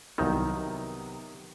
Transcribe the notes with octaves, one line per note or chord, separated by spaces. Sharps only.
C2 C3 D#3 F#3 B3 D#4